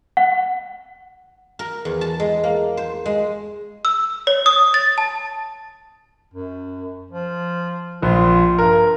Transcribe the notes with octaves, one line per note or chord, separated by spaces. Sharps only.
F#5
A#4
E2
A5
G#3
A#3
C5
G#3
E6
C#5
D#6
A6
A5
F#2
F3
A#1 F4
G2 A#4